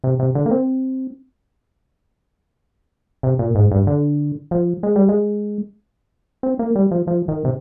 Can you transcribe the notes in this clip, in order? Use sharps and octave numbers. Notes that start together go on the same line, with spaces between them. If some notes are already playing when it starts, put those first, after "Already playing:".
C3
C3
D3
A#3
C4
C3
A#2
G#2
G2
D3
F3
G#3
G3
G#3
C4
A#3
G3
F3
F3
D#3
C3